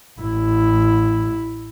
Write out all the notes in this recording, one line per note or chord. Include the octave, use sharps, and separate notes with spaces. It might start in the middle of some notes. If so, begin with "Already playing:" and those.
A1 E4